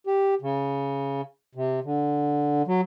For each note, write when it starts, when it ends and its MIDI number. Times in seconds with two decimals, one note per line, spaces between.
0.07 0.35 67
0.42 1.21 49
1.55 1.80 48
1.84 2.62 50
2.67 2.81 54